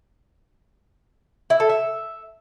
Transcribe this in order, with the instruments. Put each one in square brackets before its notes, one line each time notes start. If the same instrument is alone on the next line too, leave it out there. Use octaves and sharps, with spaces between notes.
[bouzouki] E4
A4
E5